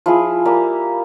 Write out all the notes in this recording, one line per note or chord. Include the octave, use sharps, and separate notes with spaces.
F3 E4 G#4
G3 A#3 G4